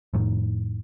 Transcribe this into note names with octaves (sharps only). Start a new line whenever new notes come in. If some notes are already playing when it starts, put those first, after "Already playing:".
F2 A2 D#3